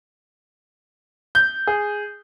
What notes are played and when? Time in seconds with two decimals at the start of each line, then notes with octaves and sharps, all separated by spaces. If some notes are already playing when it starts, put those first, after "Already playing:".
1.35 G6
1.67 G#4